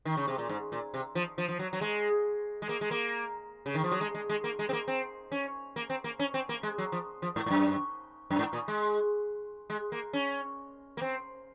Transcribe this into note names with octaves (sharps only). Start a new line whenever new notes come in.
D#3
C#3
C3
A#2
G#2
A#2
C3
F3
F3
F3
F#3
F#3
G#3
G#3
A#3
G#3
A#3
C#3
D#3
F3
F#3
G#3
G#3
G#3
A#3
G#3
C4
A#3
C4
C#4
A#3
C4
A#3
C#4
C4
A#3
G#3
F#3
F3
F3
G#2
G#2
F#2
F#2
G#2
A#2
G#3
G#3
A#3
C#4
A#3
C4